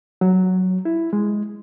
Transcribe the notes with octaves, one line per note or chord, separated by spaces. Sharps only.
F#3
E4
G#3